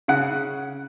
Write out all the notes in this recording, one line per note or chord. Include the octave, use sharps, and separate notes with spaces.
C#3 F#5